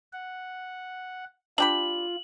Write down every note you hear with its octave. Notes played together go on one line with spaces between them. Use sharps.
F#5
D4 F4 G4 B5 F#7